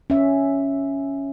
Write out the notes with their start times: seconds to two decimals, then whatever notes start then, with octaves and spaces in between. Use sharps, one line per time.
0.10 C#4 E5